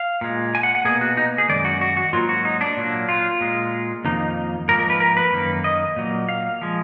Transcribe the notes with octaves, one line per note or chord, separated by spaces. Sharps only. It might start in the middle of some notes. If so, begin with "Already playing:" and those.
Already playing: F5
A#2 G#3
G#5
F#5
F#5
B2 A#3 G#4
F#4
D#4
G#4
F#2 D#3 G#3 D5
F#4
F#4
F#4
G#2 F#3 A#3 F4
F#4
D#4
D4
A#2 F#3 A#3
F4
A#2 G#3
F2 D#3 A#3 D#4
G#2 F3 A#3 A#4
A#4
B4
A#4
B4
F#2 D#3 A#3
D#5
A#2 F#3 A#3
F5
F3 G#3